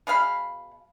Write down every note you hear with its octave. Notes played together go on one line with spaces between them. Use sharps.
B2 G#4 F5 B5